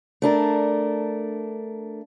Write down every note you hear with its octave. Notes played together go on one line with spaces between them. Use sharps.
A3 D4 A#4